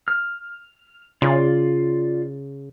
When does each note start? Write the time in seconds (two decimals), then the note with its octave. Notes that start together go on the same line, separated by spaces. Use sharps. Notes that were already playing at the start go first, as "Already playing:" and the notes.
0.08 F6
1.22 C#3 F4 D5 C6